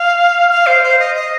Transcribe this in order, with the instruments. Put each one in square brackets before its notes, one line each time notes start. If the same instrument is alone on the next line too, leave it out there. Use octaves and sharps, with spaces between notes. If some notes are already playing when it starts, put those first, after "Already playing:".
Already playing: [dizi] F5
F5
C5
C5
D#5
D#5